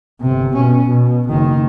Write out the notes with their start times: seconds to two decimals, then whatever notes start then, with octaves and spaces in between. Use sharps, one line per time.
0.21 G1 C3
0.53 B2 C#4
0.88 B2
1.29 F#1 D#3